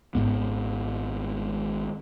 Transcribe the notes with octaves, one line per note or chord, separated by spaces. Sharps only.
G#1 F2 G#2 B3